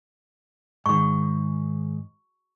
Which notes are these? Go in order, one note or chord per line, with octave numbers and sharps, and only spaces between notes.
G#2 D#3 C#6